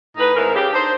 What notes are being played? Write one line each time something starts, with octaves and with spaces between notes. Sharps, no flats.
A2 D#4 B4
G#2 D#3 C4 E4 A#4
C#3 G4
D4 D#4 C5